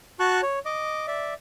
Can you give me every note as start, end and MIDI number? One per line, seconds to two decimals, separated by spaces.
0.20 0.41 66
0.20 0.41 81
0.20 0.41 85
0.20 0.41 90
0.43 0.59 73
0.65 1.06 75
0.65 1.06 86
1.07 1.34 74
1.07 1.34 76